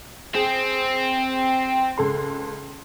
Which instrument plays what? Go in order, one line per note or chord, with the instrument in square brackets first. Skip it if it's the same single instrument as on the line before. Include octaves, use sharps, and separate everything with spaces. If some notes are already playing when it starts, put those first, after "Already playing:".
[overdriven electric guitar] C4 [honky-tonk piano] G#4
[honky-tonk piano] C#2 A4 C6